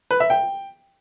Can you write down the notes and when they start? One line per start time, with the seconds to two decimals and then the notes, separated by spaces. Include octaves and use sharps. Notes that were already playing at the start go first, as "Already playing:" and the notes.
0.11 B4
0.20 E5
0.30 G5